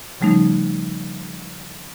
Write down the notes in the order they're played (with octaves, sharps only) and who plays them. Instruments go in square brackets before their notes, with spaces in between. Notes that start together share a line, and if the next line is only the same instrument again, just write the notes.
[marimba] C#3 F3 G3 A3 C#4 D#4